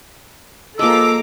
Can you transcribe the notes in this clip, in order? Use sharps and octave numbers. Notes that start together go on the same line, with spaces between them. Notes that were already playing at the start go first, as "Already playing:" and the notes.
F3 G#3 A#3 A4 A#5 D6 E6